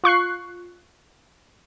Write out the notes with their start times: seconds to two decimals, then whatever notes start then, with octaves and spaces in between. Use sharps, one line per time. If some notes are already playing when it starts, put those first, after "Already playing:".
0.04 F4 C#6 F#6 C7